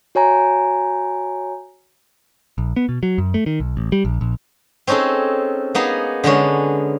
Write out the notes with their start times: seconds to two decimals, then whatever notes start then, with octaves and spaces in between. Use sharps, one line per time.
0.15 F#4 C#5 G#5 A#5
2.58 A#1
2.76 B3
2.89 B2
3.03 F#3
3.18 F#2
3.34 A3
3.46 D#3
3.60 B1
3.77 A1
3.92 G3
4.05 A#1
4.21 A#1
4.87 C4 C#4 D#4 G#4 A4
5.75 A#3 B3 D#4 G#4
6.24 D3 G#3 B3 C#4